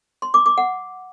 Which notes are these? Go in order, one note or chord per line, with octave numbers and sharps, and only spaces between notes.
C6
D6
D6
F#5